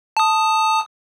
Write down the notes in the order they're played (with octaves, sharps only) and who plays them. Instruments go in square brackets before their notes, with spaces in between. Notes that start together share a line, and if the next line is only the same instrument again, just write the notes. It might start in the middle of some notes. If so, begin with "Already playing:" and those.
[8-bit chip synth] A5 D#6